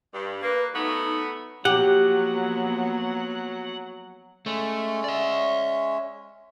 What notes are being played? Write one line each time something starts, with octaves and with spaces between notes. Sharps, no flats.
G2
A#3 B4
F#3 A3 B3 D#4
F3 F#3 A#3 B3 G4 F#5
G#3 A3 C#4 C#5
D5 E5